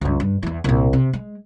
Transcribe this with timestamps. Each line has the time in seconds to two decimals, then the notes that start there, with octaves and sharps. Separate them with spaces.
0.01 C#2 G2
0.20 G2
0.43 E2 E3
0.64 C2 A#2
0.93 C3
1.13 G#3